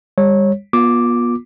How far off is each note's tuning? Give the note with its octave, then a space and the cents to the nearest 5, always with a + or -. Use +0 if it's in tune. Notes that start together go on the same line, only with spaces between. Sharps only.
G3 +35 C#5 -20
B3 -40 F4 +25 D6 +0